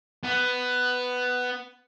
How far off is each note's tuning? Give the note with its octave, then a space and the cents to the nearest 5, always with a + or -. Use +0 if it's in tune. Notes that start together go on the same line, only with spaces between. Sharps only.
B3 +10